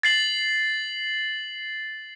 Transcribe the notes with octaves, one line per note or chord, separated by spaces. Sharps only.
A6 C7 F#7